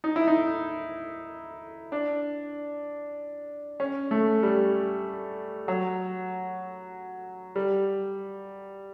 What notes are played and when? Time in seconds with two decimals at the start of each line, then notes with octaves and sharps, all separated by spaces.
0.04 D#4
0.16 E4
0.27 D#4
1.92 D4
3.80 C#4
4.11 A3
4.43 G3
5.68 F#3
7.56 G3